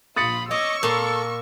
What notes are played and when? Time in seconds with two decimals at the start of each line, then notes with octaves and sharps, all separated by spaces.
0.16 A#1 F4 B5 D#6 A6 C#7
0.51 C#5 D#5 C#6 D6 E6
0.83 A#2 A4 C6